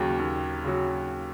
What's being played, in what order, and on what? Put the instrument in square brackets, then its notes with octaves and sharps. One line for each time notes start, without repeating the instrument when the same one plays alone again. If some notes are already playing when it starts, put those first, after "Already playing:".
Already playing: [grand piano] D#2 C#3 F#3
D#2
C#3 F#3